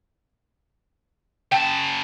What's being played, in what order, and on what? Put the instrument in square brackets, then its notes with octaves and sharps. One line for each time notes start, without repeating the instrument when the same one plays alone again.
[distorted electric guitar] C#3 A5 [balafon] G5